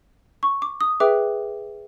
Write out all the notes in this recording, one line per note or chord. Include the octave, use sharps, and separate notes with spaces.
C#6
D6
D#6
G#4 B4 E5 G5 D6